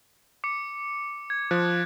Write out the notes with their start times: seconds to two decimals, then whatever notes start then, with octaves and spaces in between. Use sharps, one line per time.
0.44 D6 C#7
1.30 G#6
1.51 F3 F#6